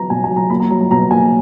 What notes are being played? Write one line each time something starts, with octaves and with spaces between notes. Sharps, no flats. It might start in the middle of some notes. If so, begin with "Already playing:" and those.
Already playing: F#3 B3 A#5
B2 G#5
G#5
F#3
A#5
A#3 B5
A#5
F#3 A#5
A#5
B2 A#5
A#3 G#5